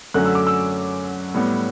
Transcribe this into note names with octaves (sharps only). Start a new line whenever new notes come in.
F#2 D3 F#3 A3 C#4 F#6
E6
D6
E6
A2 G3 B3